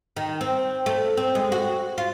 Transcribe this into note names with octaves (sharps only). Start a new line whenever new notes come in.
D#3
C4
A3
C4
G#3
F#4
F4